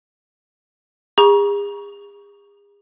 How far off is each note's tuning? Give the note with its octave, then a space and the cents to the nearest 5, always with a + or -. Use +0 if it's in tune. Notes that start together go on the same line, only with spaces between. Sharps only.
G#4 -40 A#5 +40 C#6 +10